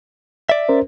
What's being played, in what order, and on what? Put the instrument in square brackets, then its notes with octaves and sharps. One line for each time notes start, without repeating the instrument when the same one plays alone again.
[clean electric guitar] D5 E5
[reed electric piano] C#4 A#4 C5